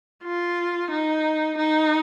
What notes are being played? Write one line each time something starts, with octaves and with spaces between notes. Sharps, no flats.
F4
D#4
D#4